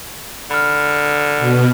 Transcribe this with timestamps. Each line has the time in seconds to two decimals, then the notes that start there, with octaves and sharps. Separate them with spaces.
0.51 D3 B5 F6
1.39 B2